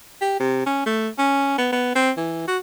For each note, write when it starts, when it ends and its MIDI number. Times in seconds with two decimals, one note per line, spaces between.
0.21 0.40 67
0.40 0.62 48
0.66 0.84 61
0.86 1.09 57
1.18 1.56 61
1.58 1.68 59
1.72 1.94 59
1.95 2.11 60
2.17 2.43 52
2.48 2.58 66